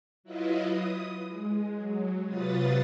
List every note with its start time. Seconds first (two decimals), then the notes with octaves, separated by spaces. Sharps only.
0.24 F#3 E4 F4 B4 D#5
0.70 D#6
1.28 G#3
1.76 F#3
2.26 C3 F#3 F4 B4 D#6 A6